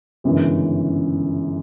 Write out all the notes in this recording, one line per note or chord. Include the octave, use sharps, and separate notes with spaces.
G1 F#2 C#3 E3 G#3